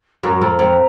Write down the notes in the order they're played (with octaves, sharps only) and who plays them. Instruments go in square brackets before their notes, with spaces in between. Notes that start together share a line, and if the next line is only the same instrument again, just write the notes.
[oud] F#2 [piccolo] A#5
[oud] F2
F2